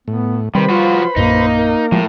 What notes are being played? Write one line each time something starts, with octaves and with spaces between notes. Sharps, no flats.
A2 B3
C3 D#3 G3 B4 C5 B5
F3 F4 F#4
A#1 F#2 A#2 A#3 D#4
A#4
A2 F3 G#3